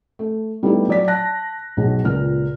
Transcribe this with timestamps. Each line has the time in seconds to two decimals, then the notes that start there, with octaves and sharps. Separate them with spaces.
0.19 A3
0.63 G3 A3 B3 D#4 E4 G4
0.88 F#3 D5 B6
1.08 A5 F#6 A#6
1.77 B1 F#3 G#4
2.04 C#2 A#2 F6